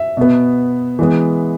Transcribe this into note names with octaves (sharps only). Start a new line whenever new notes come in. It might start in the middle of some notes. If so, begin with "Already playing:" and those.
Already playing: E5
B2 B3
E3 G#3 B3